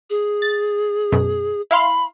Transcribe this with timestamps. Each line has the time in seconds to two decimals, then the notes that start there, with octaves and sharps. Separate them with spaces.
0.10 G#4
0.42 A6
1.12 F#2 B2
1.71 E4 F5 B5 C6